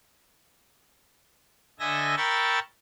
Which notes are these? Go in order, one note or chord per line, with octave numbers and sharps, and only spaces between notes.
D3 A4 D#5 E5 G#5 A#6
A#4 G5 B5 C#6 E6 A6